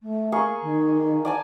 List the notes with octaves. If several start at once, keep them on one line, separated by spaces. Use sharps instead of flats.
A3
A#3 G#4 C#6
D#3
D5 G#5 A5